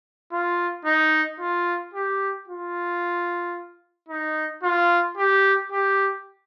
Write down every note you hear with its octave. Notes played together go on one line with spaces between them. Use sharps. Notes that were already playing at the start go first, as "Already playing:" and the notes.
F4
D#4
F4
G4
F4
D#4
F4
G4
G4